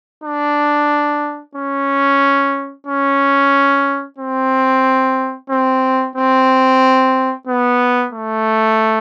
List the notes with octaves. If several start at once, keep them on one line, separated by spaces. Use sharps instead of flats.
D4
C#4
C#4
C4
C4
C4
B3
A3